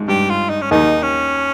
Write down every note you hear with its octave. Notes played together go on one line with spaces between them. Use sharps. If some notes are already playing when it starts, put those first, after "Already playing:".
Already playing: G#1 G#2
G2 G4
F4
D#4
C#4
D#2 D#3 D#4
C#4